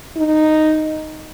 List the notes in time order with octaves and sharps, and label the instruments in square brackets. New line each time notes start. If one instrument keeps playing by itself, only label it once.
[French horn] D#4